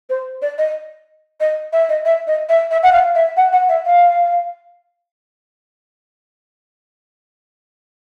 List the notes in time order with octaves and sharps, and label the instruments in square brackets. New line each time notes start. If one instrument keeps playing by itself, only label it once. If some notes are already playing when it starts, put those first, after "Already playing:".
[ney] C5
D5
D#5
D#5
E5
D#5
E5
D#5
E5
E5
F#5
F5
E5
F#5
F#5
E5
F5